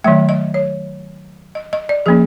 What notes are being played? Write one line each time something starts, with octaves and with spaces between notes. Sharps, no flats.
D#3 F#3 A3 E5
D#5
C#5
D#5
D#5
D5
F3 A#3 C#4 G#4